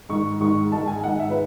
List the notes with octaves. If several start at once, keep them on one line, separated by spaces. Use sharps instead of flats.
G#2 D#3 G#3 C#6
G#2 D#3 G#3 C#6
G#2 D#3 G#3 A5
G#5
G#2 D#3 G#3 F#5
E5
B4